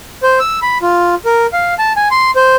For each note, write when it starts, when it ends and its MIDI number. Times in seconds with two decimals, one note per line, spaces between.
0.23 0.39 72
0.40 0.60 88
0.62 0.78 83
0.82 1.15 65
1.25 1.46 70
1.53 1.74 77
1.79 1.93 81
1.97 2.08 80
2.11 2.31 84
2.36 2.56 72